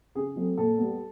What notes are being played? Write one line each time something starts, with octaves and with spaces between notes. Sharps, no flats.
C#3 G#4
F#3 A3 C4
A#2 A4
G3 B3